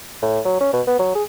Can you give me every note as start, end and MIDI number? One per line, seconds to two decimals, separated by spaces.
0.22 0.40 45
0.45 0.56 54
0.60 0.71 61
0.73 0.82 47
0.87 0.95 59
0.99 1.14 54
1.15 1.23 68